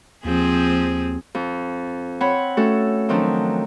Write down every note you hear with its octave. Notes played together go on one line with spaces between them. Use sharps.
D#2 F3 C4 G#4
F2
C4 C#5 F#5 B5
A3 C#4 F#4 A4
D#3 F3 F#3 C4 D4